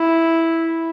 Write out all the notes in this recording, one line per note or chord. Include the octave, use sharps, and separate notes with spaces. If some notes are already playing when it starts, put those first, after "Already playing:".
Already playing: E4